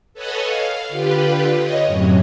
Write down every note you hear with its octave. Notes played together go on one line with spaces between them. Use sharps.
A4 B4 C#5 D#5 F#5 G#5
F5
D3 F4 G4 B4
C#5 D#5
F#2 A2 C3 F#3